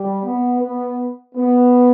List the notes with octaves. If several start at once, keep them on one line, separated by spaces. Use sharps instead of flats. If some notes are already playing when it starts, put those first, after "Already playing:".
Already playing: G3
B3
B3
B3